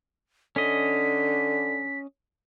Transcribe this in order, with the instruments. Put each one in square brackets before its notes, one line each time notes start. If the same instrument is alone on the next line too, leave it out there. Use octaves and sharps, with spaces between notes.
[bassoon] D3 [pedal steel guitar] C#4 D#5 [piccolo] B6